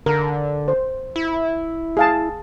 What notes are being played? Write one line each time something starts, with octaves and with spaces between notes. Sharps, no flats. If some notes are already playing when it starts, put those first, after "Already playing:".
D3 A#4
C5
E4
G#4 F5 A5